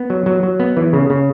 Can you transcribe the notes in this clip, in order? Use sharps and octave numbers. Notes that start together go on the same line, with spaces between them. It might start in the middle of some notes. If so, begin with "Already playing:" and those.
Already playing: B3
F#3
F#3
F#3
B3
E3
C#3
C#3